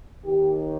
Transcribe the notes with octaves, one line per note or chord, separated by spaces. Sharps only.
D#2 D#3 G4